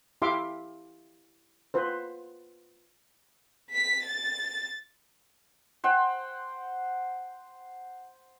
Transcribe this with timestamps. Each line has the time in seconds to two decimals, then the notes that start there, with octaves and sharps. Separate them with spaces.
0.22 E4 G4 E5 F5 C6 D6
1.74 F4 B4 C5
3.71 B6
4.02 A6
5.84 C5 F#5 G5